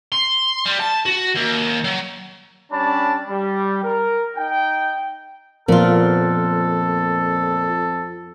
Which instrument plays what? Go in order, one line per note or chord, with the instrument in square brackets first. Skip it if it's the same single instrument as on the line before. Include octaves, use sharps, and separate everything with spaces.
[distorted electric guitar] C6
G3
A5
F#4
D#2
F#3
[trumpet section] G3 C#4 D4 A5 B5
G3
A#4
D#4 G5
[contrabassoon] F2 [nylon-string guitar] A#2 F4 [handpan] F3 B3 A#4 [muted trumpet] A4